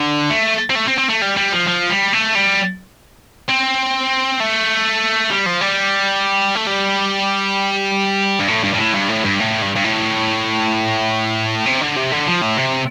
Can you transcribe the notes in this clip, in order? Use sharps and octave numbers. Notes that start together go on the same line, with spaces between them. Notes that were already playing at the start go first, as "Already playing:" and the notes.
Already playing: D3
A3
C4
A3
C4
C4
A3
G3
G3
F3
F3
G3
A3
G3
C4
A3
G3
F3
G3
A3
G3
G2
A2
G2
G2
A2
G2
A2
G2
A2
G2
G2
A2
C3
D3
C3
D3
F3
A2
C3